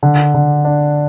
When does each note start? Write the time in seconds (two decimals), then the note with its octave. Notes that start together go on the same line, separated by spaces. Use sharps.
0.03 D3
0.34 D3
0.65 D4